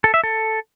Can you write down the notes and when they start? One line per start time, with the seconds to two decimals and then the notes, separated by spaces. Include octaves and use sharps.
0.04 A4
0.14 E5
0.24 A4